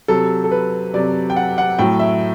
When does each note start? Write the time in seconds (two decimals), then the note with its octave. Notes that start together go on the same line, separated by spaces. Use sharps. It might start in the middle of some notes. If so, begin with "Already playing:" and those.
0.08 C3 F#3 A4
0.44 A4
0.51 B4
0.94 C3 F#3 D5
1.30 G5
1.36 F#5
1.58 F#5
1.79 A2 F#3 G5
2.00 E5